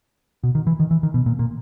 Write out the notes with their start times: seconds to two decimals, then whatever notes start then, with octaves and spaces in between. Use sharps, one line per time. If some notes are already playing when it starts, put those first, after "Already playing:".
0.44 B2
0.55 D#3
0.67 E3
0.80 D#3
0.91 E3
1.03 D#3
1.14 B2
1.26 A#2
1.39 A#2